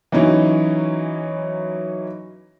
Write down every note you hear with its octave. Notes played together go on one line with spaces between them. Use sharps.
E3 F#3 C#4 D#4 E4